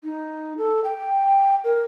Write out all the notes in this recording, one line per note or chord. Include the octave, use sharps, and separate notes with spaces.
D#4
A4
G5
A#4